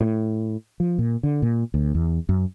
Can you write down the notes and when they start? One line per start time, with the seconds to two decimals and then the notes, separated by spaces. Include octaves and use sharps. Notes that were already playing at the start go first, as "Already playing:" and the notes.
0.01 A2
0.80 F3
0.99 A#2
1.23 D3
1.42 A#2
1.74 D2
1.95 E2
2.29 F#2